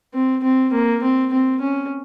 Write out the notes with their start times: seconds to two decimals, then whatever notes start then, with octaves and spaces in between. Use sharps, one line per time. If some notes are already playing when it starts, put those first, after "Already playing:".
0.14 C4
0.44 C4
0.73 A#3
1.03 C4
1.33 C4
1.61 C#4